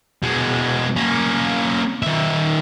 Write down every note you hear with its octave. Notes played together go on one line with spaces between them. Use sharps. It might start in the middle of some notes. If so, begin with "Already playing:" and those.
B2 G#3
A#3 C#4
D#3 E5